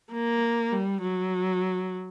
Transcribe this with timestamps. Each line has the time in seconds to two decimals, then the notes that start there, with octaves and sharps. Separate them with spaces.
0.12 A#3
0.72 G3
1.02 F#3